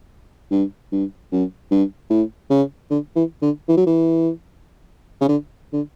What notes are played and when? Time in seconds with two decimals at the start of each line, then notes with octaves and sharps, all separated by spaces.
0.51 G2
0.92 G2
1.32 F#2
1.71 G2
2.10 A2
2.50 C#3
2.90 D3
3.16 E3
3.42 D3
3.68 E3
3.77 F#3
3.86 E3
5.20 C#3
5.28 D3
5.73 D3